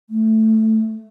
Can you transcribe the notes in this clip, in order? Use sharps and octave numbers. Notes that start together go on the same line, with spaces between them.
A3